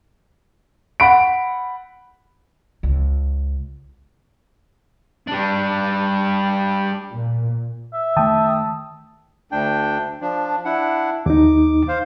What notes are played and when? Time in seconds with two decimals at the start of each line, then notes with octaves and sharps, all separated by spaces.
1.00 F#5 B5 D7
2.83 C#2
5.27 G3 D4
7.12 A#2
7.93 E5
8.17 D#3 A3 G5 A5 D#6
9.52 D2 D4 G5
10.21 F3 D4
10.65 D4 E4 F#5
11.26 D#2 D#4 D6
11.88 C5 F5